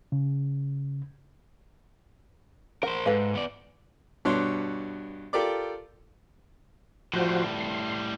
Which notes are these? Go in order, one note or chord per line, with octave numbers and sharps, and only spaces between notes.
C#3
A#4 C5 F#5
G#2 A4 B4 F5
B3 D5
G2 B2 D4 C#5 C6 F#6
F4 G4 A4 A#4 D5 D6
A2 F3 G3 F#4 C5
C6